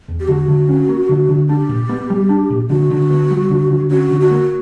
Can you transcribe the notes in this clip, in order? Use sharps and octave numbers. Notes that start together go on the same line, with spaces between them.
E2
G4
D3 F#4
D3
C#4
A#3
D3
D3
D4 G4
A#2
B3
G3
D4
A#2
D3 F#4
D3
B3
G3
D3
D3
C#4 F#4
D3
F#4
A#3